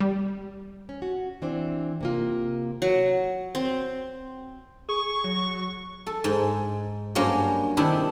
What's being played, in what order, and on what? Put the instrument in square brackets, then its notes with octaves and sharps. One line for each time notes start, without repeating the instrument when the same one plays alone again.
[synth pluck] G3
[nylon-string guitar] C#4
F#4
E3 C4 D4 C5
C3 A#3 F4
[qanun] F#3
C4
[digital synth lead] G#4 [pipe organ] C#6
[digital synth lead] F#3
[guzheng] A4
G#2
G2 F#3 A#3 C#4
C3 D#3 D4 E4